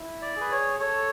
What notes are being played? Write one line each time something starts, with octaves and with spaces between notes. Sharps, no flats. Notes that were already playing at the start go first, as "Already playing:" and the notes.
Already playing: E4
D5
G#4 B4
C#5
A4 C#5